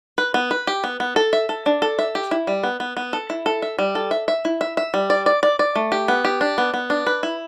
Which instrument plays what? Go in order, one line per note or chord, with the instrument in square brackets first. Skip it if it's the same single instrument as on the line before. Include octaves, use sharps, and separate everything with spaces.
[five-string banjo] B4
B3
B4
G4
B3
B3
A4
E5
A4
D4
A4
E5
G4
E4
G3
B3
B3
B3
A4
E4
A4
E5
G3
A4
E5
E5
E4
E5
E5
G3
D5
D5
D5
D5
A3
G4
B3
G4
D4
B3
B3
D4
B4
E4